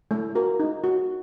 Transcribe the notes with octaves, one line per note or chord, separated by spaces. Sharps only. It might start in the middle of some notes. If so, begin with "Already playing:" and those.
A3
F#4 A#4
D#4
F#4